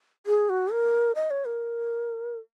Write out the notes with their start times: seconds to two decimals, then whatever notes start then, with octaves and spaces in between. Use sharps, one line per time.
0.27 G#4
0.49 F#4
0.72 A#4
1.15 D#5
1.31 C#5
1.45 A#4